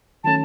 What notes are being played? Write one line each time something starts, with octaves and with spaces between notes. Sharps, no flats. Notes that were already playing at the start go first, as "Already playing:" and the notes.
D#3 F#3 A3 C#4 A4 A5